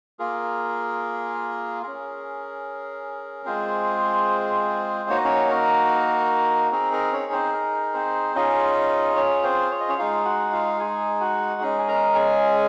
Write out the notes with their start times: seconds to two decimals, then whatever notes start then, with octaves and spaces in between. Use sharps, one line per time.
0.19 A#3 F4 G#4 A#4
1.83 C#4 G#4 A#4
3.46 G#3 C4 F4 G#4 C5
5.09 A#3 D#4 F#4 C#5
5.17 D#5
5.24 C#4 C#5
5.49 A#4
6.72 C4 D#4 G#4 A#4
6.93 A#4
7.12 C#4 C#5
7.32 C4 C5
7.53 A#4
7.94 C4 C5
8.35 C#4 D#4 F4 G#4 D#5
9.16 C#4 C#5
9.43 C4 C5
9.71 C#5
9.80 D#5
9.89 C#4 C#5
9.98 G#3 D#4 F4 G#4 F5
10.25 F#4 F#5
10.52 F4 F5
10.80 G#4 G#5
11.20 F#4 F#5
11.61 G#3 C#4 D#4 G#4 D#5
11.79 G#5
11.88 A#4 A#5
12.15 G#4 G#5